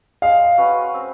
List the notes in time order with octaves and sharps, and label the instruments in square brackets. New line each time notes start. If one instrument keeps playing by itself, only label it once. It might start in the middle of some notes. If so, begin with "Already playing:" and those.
[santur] G#3 [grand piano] F5
[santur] C#4 F#4 B4
C4